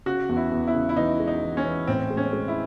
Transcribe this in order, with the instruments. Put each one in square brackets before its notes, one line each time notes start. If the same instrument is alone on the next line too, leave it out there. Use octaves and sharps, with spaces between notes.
[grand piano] C#3 [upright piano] F#4
[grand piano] E2
[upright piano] E4
[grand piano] E2
[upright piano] E4
[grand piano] C#3
[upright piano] E4
[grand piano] E3 [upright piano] D#4
[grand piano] G#3
[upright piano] D#4
[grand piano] E3
[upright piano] C#4
[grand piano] E3
[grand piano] A2 [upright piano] C4
[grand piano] G#3
[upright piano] C#4
[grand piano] G#3
[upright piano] E4